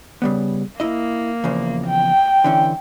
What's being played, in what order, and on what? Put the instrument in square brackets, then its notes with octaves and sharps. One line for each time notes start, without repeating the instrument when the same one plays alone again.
[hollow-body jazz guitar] C#3 G3 B3
[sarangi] A#3 [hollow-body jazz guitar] E4 D#5
[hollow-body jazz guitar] E2 C#3 F3
[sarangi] G5
[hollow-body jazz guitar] D3 E3 C#4